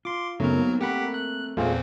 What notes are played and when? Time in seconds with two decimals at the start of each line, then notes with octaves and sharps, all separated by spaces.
0.05 F4 C6 D6
0.40 F#2 C#3 F#3 A3 B3 C4 D#4 A#4
0.58 A#3
0.81 A3 C4 G4 A#4 F#5 B5
1.14 F#6
1.57 E2 A#2 A3 C4 F4 G#4